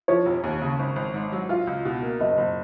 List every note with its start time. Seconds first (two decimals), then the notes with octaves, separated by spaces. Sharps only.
0.08 F3 C#5
0.26 F1
0.44 D#2
0.62 C#3
0.79 G#1
0.96 G#1
1.14 G#2
1.32 F#3
1.49 F4 F5
1.67 C#2
1.85 B2
2.02 A#3
2.20 F#1 D#5
2.38 F#1